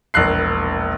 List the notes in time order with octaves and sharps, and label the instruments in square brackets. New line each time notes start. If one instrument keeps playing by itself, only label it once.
[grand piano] E1 A#1 A#3 F#6 C7